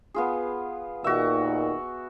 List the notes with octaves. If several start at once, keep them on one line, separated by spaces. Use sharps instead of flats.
B3 F4 G#4
D#2 A#2 D#3 F#4 E5